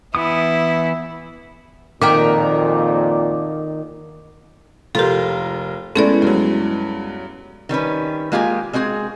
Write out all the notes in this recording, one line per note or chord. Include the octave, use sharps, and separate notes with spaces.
E3 B3 E4 D#6
F2 A#2 D#3 F#4 A#4 G5 D6
F1 F4 G4 A4 A#4
G#3 A3 B3 C#4 E4 A4 D5
G2 F#3
D#3 G3 C#4 B4
G#3 A#3 F4 G4 C#5 G#5
G#3 C4 F#4 G#4